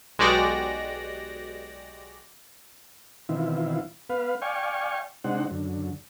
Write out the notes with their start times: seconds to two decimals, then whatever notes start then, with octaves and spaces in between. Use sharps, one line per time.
0.19 B1 G#3 F#4 G4 D5 A#6
3.29 B2 D#3 E3 C4 E4 F4
4.10 B3 B4 F5
4.42 D5 F5 G5 G#5 C#6
5.24 C3 G#3 D4 D#4 C5 F#5
5.51 F#2 D3